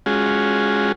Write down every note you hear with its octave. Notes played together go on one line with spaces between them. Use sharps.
G#3 C#4 F4 F#4 G#4